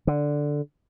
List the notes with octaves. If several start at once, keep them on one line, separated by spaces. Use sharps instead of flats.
D3